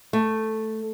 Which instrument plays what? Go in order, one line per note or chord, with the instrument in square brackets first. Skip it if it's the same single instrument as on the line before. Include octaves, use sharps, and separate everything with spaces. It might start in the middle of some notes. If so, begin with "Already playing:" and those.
[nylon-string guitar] A3